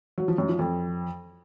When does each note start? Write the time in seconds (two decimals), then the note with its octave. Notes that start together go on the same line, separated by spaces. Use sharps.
0.18 F#3
0.28 F3
0.38 F#2
0.49 F3
0.59 F2